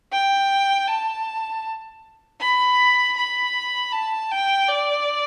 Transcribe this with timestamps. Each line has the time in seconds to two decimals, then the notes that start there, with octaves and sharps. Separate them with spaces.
0.12 G5
0.88 A5
2.40 B5
3.17 B5
3.92 A5
4.31 G5
4.69 D5